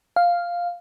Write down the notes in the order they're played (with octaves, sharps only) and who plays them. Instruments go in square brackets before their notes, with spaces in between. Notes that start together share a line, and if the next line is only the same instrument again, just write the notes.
[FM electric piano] F5